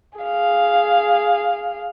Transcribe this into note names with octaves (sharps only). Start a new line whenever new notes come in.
G#4 F5